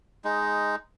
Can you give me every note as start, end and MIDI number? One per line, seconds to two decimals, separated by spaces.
0.24 0.76 56
0.24 0.76 63